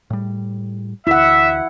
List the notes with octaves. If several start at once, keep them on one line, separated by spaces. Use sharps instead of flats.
A2 G3
D2 E4 E5 F#5